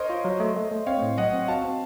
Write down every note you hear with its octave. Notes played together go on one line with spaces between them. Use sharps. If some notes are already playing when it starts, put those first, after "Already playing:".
Already playing: A#4 C5 C#5 D#5
F4
F#3
A3
A3
A3
C4 C#5 F5
A2
F#3 D#5 F#5
C4
F#4 F5 A5
C4